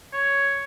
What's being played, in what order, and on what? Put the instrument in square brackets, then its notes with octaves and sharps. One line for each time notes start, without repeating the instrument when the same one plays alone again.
[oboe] C#5